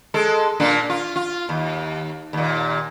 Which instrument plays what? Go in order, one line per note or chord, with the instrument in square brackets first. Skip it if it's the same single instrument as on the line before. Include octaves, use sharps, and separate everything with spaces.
[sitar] G#3 A4
A#2 A#3 D4
F4
F4
D#2
D#2 A#2